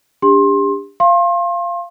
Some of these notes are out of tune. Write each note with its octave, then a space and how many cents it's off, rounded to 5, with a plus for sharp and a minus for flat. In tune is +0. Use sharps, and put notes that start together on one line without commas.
D4 -10 G4 +35 C6 +25
F5 -15 C6 +35